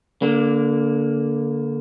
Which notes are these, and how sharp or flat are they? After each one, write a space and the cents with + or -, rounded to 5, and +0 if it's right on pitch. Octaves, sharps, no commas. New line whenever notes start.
D3 -20 A#3 +5